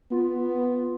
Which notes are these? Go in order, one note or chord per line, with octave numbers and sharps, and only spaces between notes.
B3 F4